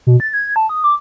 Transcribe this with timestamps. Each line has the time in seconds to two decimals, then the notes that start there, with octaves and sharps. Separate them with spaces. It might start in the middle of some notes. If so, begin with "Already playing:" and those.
0.07 B2
0.20 A6
0.33 G#6
0.56 A5
0.69 D#6
0.84 D6